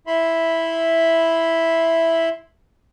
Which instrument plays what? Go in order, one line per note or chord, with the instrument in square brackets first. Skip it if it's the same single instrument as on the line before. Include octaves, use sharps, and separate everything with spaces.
[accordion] E4 E5 B5 C6